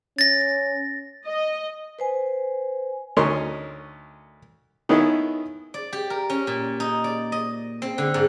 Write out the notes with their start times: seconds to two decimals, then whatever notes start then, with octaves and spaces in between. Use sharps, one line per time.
0.19 C#4 A6 A#6
1.25 D#5
1.99 B4 C5 G#5
3.17 D2 C#4 D#4 A#4 C6 C#6
4.89 D#3 B3 C#4 D#4 E4 G#4
5.74 D5
5.93 G4
6.10 A#4
6.30 C#4
6.47 A#2
6.80 D#4
7.04 D5
7.32 D#5
7.82 C4
7.98 D3
8.14 G#2